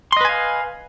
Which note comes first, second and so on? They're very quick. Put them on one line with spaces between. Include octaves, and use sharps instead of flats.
C6 D#5 B4 G#5 F5